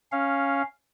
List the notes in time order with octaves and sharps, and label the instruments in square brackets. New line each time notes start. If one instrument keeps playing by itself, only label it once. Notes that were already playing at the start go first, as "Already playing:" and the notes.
[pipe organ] C#4 F5